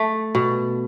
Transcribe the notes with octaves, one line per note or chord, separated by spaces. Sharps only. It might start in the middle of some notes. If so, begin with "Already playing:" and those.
Already playing: A3
B2